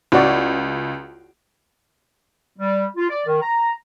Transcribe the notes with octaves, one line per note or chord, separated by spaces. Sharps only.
C#2 E4 F#4 D5
G3
F4
D5
D#3
A#5